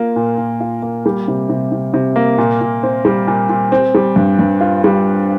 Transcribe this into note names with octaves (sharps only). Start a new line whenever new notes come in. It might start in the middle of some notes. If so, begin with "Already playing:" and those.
Already playing: A#3 F4
A#2
A#2
F4
A#3
G3
C3
C3
C3
C3
A#3
A#2
A#2
C4
G3
A#2
A#2
C4
G3
G2
G2
F4
G3